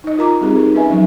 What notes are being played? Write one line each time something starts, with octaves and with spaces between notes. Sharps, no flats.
D#4 D#5
F4 A#4 A#5 D6
G3 C4 D#4 G4 G#4
D#4 G4 A#4
C#4 B4 D#5 E5 G#5
F3 F#3 D#4 E5